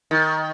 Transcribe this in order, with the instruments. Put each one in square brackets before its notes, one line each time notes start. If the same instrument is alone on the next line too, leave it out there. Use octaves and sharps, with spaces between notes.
[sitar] D#3